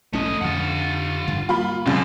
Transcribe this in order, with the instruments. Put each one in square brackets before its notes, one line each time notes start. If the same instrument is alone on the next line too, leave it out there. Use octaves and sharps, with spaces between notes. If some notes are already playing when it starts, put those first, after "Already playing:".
[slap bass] A#1 G#2 C#4 [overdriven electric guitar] A3 D#5
[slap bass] F2 D3 [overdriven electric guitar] F4 F#5
[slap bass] G2 D3
[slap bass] G3 A#3 [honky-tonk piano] F4 B5
[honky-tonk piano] C#2 F#2 [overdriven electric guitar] F4 A4